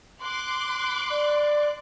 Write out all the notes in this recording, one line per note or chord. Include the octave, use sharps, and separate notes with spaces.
C6 D6 F#6
D5